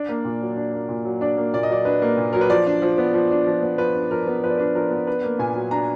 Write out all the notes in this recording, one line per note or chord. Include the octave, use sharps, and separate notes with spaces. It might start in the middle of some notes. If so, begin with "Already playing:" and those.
Already playing: D4 D5
A#3
A#2
F#3
D4
A#3
A#2
F#3
D4 D5
A#3
A#2 D5
D#5
F#3 D5
D4 B4
A#3
A#2
F#3 A#4
B4
F3 D5
D4
F3
B3
F3
D4
F3
B3
F3 B4
D4
F3 A#4
B3
F3 B4
D5
D4 B4
F3 A#4
B3
D4 B4
A#3
A#2 G#5
F#3
D4 A#5